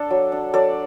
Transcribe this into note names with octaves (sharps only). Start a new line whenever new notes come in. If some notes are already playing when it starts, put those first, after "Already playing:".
Already playing: D4 A4 D5
F#3
D4
F#3 A4 D5